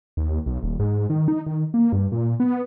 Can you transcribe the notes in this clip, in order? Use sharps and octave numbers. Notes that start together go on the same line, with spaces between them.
D#2
B1
D#1
G#2
D#3
D#4
D#3
A#3
G2
A#2
B3